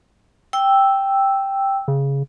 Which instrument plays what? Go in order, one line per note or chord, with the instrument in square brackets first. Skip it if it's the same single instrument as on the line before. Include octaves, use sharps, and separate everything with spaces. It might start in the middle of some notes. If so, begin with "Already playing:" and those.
[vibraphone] G5 E6
[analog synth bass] C#3